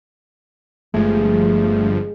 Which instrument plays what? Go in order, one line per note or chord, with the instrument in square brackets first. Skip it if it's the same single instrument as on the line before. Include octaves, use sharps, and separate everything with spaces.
[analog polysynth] G1 G2 F3 [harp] G#3 [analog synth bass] A3